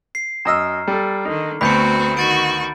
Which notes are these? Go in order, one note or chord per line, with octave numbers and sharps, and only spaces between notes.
C7
F#2 D#5 A#5 E6 F6
G3 A4
D3 D#3 D#4
D2 A3 B3 C4 F#4 B5 G6 C#7
D#3 F#4 C#6 A6 D7